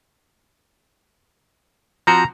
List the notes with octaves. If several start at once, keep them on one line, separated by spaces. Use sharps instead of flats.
F3 C4 F#4 A#5